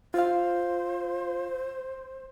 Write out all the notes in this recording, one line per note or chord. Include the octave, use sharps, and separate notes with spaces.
F4 C5 F5